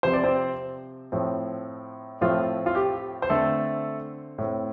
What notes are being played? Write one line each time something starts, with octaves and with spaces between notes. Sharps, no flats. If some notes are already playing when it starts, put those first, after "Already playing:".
C3 F3 C4 C5
D5
C4 C5
A2 F3 C4
A2 F3 A3 C4 F4
F4
G4
C5
D3 A3 C4 A4
A2 A3 C4